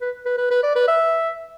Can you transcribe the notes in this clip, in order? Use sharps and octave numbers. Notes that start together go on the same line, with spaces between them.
B4
B4
B4
B4
D5
B4
E5